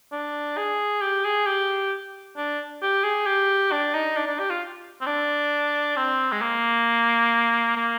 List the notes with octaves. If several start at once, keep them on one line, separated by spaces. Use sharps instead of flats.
D4
G#4
G4
G#4
G4
D4
G4
G#4
G4
D4
D#4
D4
D4
G4
F4
C4
D4
C4
G#3
A#3
A#3